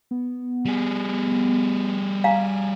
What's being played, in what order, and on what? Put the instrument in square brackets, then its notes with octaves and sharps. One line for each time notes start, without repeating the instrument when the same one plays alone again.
[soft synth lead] B3
[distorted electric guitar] G3 G#4
[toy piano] F5 A#5 [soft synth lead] G#5